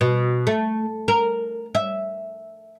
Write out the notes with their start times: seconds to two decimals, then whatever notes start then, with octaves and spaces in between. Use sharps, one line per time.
0.01 B2
0.47 A3
1.08 A#4
1.75 E5